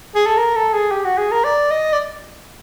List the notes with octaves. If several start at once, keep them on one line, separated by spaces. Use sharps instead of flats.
G#4
A4
A#4
A4
G#4
G4
F#4
G#4
A#4
D5
D#5
D5